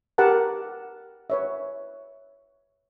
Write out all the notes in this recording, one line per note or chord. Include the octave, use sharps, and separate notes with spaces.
G4 A#4 B4 F#5 A5
B4 C#5 E5